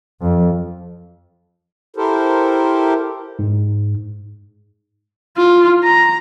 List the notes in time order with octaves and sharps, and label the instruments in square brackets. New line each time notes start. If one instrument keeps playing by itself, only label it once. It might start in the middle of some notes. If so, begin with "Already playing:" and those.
[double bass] F2
[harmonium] E4 G4 A4 A#4 C5
[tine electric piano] G#2
[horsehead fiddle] F4
A#5